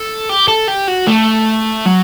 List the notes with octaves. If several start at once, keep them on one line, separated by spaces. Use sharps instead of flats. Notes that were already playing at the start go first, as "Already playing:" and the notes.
Already playing: A4
G4
A4
G4
F#4
A3
F#3